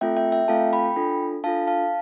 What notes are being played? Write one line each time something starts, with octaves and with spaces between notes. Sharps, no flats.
A3 C4 F4 A4 E5 G5
E5 G5
E5 G5
A3 C4 F4 A4 F5 A5
G5 B5
D4 F4 A4
D4 F4 A4 F5 A5
F5 A5